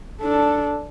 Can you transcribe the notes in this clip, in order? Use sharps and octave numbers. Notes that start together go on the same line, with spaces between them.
D4 A4